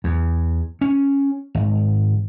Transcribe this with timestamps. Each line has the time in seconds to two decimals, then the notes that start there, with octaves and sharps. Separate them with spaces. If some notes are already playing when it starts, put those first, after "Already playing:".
0.04 E2
0.81 C#4
1.55 G#1